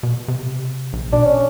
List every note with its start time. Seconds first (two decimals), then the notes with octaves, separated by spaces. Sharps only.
0.03 B2
0.28 C3
0.93 A#1
1.13 B2 D4
1.26 C#4